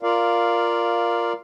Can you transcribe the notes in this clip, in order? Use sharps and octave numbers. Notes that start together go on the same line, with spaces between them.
F4 A#4 D5 F5